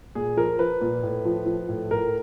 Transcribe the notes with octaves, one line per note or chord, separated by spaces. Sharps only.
A#2 G#4
F3 A#4
F3 B4
A#2
A2
F3
F3
A2
A2 A#4